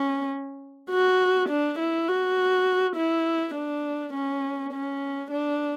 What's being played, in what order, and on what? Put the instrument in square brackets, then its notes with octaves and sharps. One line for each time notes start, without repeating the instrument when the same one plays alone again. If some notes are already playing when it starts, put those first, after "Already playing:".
Already playing: [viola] C#4
F#4
D4
E4
F#4
E4
D4
C#4
C#4
D4